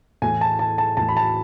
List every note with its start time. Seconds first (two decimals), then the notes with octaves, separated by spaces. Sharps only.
0.22 A2 E3 A3 G#5
0.41 A5
0.59 A5
0.78 A5
0.97 A2 E3 A3 A5
1.09 B5
1.17 A5